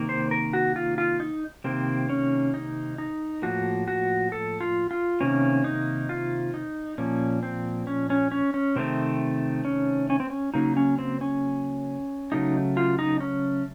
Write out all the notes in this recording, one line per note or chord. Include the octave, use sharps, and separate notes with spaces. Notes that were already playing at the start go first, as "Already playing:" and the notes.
Already playing: C3 D#3 A#3
C5
A#4
F#4
F4
F4
D#4
C3 D#3 A#3 C4
C#4
D#4
D#4
A2 F3 A#3 F#4
F#4
A4
F4
F4
C3 D#3 A#3 C#4
D#4
F4
D#4
A#2 F3 A#3 C#4
C4
C#4
C#4
C#4
C#4
C3 D#3 A3 C4
C#4
C#4
C4
C#4
C#3 F#3 A#3 D#4
C#4
C4
C#4
C#3 F#3 A3 D#4
F4
D#4
C#4